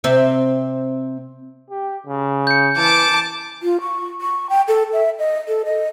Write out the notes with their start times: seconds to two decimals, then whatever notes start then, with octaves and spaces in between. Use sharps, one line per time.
0.04 C3 C4 E5
1.70 G4
2.07 C#3
2.47 G6 C#7
2.77 E3 A5 D6
3.63 F4
3.81 C#6
4.21 C#6
4.50 G5
4.68 A4
4.93 E5
5.19 D#5
5.48 A4
5.66 D#5